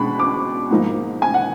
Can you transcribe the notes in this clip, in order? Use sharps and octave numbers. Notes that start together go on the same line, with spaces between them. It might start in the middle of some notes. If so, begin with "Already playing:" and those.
Already playing: B2 G#3 D4 B5
D6
G#2 F3 A#3 D#4
G#5
F#5